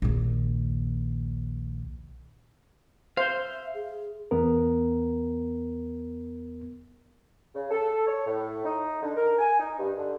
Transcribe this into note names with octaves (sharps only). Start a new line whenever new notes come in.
A#1 D#2
C5 E5 F5
G#4
E2 B3 A#4
C#3
A4
C#5
A2
D#4
D3
A#4
G#5
D#4
G2
D3